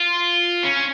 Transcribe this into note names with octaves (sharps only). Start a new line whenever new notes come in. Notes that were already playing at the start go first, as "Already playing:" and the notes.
Already playing: F4
C#4